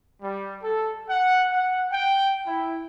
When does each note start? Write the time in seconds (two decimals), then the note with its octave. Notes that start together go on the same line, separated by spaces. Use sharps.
0.22 G3
0.63 A4
1.10 F#5
1.52 F#5
1.91 G5
2.47 E4